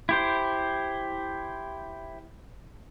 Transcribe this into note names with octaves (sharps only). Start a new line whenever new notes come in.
E4 G4 C5